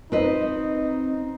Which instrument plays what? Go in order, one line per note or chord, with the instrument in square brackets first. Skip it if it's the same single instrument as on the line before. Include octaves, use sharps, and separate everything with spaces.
[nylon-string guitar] C4 B4 D#5 [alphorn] D#4